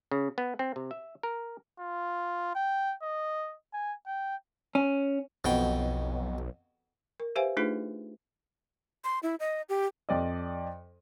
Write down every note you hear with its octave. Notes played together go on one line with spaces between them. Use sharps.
C#3
B3
C4
C3
E5
A#4
F4
G5
D#5
G#5
G5
C#4
B1 F2 B2 G5
A#4
G4 B4 C5 E5 F5 G#5
A3 D4 D#4 F4 G#4 B4
C6
E4
D#5
G4
F2 D5 D#5